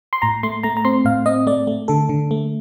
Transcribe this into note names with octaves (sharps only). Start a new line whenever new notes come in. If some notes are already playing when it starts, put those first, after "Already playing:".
C6
A2 A#5
A3 C6
A3 A#5
A#5
C4 C6
A2 F5
C4 D#5
A3 D5
A3
D3 A4
D3
A3